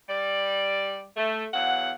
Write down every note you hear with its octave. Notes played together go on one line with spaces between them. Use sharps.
G3 D5
A3
E2 F#3 F5 F#5